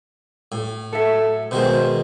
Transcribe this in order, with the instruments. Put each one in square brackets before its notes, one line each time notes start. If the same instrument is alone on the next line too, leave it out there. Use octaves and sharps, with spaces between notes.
[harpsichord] A2
[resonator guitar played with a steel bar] F#3 E5 [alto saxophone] A4
[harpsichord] B2 D#3 G#3 [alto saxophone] C5